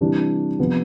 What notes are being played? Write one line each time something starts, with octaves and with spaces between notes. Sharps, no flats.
C3 E3 G3 D4
C3 F3 B3